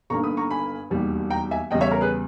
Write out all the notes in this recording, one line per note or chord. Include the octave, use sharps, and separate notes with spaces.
G1 G2 D#3 A#3 A#5 C#6
B5 D#6
A#5 C#6
G#5 B5
E1 D#2 D#3 G3
G5 A#5
E5 G#5
E2 C#3 G3 D#5 G5
C#5 E5
A#4 C#5
G#4 B4